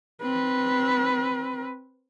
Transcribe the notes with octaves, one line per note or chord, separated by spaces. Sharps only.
C4 B4